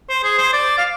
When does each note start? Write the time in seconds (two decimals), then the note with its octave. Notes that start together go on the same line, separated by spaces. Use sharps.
0.09 C5
0.24 G#4
0.38 C5
0.53 D5
0.78 F5